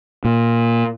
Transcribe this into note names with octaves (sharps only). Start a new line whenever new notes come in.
A#2